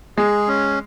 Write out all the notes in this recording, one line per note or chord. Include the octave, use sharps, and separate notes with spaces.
G#3 G#4
C#4